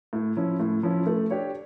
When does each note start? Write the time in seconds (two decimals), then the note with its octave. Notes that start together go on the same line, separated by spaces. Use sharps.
0.13 A2
0.36 F3 C#4 E4
0.60 A2
0.83 F3 C#4 E4
1.06 A3
1.31 D4 G4 C#5